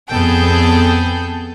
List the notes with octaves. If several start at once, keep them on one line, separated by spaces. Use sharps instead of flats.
F2 B3 G#4 A4 G5 G6